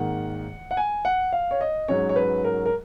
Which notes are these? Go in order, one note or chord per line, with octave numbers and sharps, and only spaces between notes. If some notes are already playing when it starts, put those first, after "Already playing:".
Already playing: G#1 G#2 D#3 A#3 F#5
F#5
G#5
F#5
F5
C#5
D#5
G#2 F#3 C#4 C#5
C#5
B4
A#4
A#4